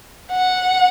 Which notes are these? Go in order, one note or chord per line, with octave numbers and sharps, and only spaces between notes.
F#5